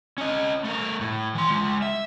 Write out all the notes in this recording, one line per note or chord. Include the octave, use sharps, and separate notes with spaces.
C#4 D#5
A3 A#4
A2
E3 C6
G#3 F4
E5